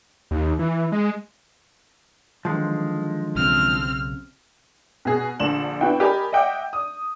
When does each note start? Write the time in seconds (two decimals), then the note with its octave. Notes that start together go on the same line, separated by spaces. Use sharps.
0.31 D#2
0.59 E3
0.92 G#3
2.45 D3 D#3 F3 F#3 G#3
3.36 B1 C#3 C4 F6
5.05 B2 G#4
5.40 A#1 D3 E7 F#7
5.81 B3 D4 E4 F#4 G5
6.00 G4 A#4 D5 D#5 G#5 B5
6.32 D#5 E5 F#5 G5 D6
6.73 D#6